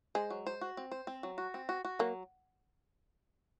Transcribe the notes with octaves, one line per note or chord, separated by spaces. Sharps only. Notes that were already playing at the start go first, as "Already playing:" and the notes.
G#3 C5
F#3
C5
F#4
C4
C5
C4
F#3
F#4
C4
F#4
F#4
F#3 A#3